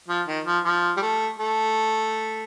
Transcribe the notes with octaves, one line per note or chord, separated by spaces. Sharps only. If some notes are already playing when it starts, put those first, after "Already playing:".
F3
D#3
F3
F3
G3
A3
A3